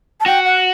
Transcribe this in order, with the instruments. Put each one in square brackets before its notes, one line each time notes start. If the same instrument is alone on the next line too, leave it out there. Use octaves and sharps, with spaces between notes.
[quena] A5
[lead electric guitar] F#4 [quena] G5
[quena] F#5